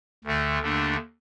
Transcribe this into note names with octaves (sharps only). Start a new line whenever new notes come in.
D2 D3 A3
D#2 D3 A3 D4